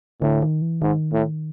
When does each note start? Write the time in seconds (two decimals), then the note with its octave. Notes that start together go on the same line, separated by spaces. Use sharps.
0.22 A2 D3
0.42 D#3
0.62 E3
0.82 G#2 D#3
1.13 A2